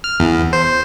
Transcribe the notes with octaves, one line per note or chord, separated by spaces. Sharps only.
F6
E2
C5